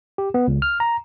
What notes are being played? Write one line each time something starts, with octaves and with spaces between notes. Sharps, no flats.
G4
B3
C#2
F6
A#5